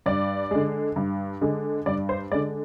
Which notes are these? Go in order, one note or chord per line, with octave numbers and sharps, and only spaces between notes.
G2 D5
D3 G#3
G2
D3 G#3
G2 D5
C5
D3 G#3 D5